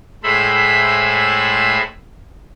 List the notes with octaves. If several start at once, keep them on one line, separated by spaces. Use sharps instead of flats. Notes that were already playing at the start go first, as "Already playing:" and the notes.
A2 G#3 A4 C5 E5 B5